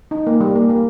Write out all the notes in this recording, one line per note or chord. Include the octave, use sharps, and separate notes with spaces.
D#4
A#3
G3
A#3
A#3